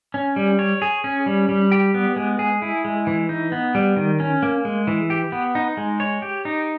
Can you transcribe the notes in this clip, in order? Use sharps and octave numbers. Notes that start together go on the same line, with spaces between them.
C#4
G3
C#5
G#4
C#4
G3
G3
G4
B3
G#3
G#4
E4
G#3
E3
D#4
B3
G3
D#3
C#4
A#3
G#3
E3
G4
B3
D#4
G#3
C#5
G4
D#4